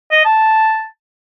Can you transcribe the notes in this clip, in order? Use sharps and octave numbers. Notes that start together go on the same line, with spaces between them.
D#5
A5